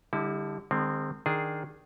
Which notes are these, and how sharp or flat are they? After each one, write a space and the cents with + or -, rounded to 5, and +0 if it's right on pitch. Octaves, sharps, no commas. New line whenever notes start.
D3 +0 G3 +25 E4 -35
D#3 -45 G#3 -30 C4 +0
D#3 +0 D4 +5 G#4 +0